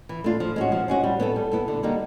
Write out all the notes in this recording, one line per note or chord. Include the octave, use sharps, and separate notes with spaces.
E3
A3 D4 F4
F3
G#3 C#4 F#4
F3
G#3 C#4 F#4
G3
B3 E4 A4
G3
B3 E4 A4
D3
G3 A#3 D#4 F#4